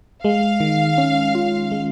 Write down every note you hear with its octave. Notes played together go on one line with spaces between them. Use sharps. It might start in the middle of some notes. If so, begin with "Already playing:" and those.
G#3 F5
D#3
C#4
F4
G#3